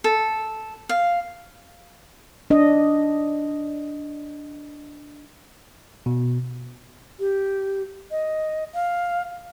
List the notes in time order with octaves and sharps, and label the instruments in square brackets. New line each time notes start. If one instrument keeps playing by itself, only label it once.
[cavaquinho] A4
F5
[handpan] D4 D#5
[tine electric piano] B2
[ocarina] G4
D#5
F5